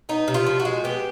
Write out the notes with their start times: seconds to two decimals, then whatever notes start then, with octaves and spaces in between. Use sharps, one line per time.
0.09 B3 D#4
0.28 C3
0.34 F4
0.47 F3
0.60 F#4
0.65 G#3
0.84 B3 G4